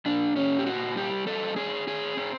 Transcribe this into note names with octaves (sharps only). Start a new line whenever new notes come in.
A#2 D4
A#2 C#4
G4
C4 F#4
G3 G4
C4 A4
C4 G#4
C4 G#4
C4